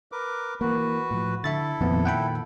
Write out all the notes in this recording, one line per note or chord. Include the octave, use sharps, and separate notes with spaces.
A#4 B4 D6
E3 A#3 F#4 B4
A2 F3
D3 E4 A4 E5 B5 A6
F2 A#2 D#3 F3 B3
F#5 G5 B5